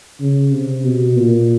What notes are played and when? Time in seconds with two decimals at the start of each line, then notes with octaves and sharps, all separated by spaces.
0.20 C#3
0.52 C3
0.84 B2
1.16 A#2